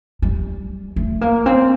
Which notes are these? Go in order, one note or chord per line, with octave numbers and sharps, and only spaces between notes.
G3
A3
A#3
C4